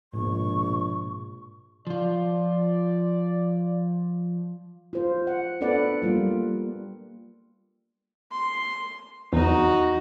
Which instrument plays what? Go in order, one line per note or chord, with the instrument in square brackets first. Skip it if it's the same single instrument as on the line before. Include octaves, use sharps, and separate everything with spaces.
[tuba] A#1 [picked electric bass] G#2 B2 [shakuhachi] C#6
[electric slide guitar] F3 F4 [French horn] D5
[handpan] F4 C5
F#5
B3 D4 A4 B4 D5 F#5
G3 A#3 F4
[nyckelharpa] C6
[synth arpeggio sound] E2 [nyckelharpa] D#4 F#4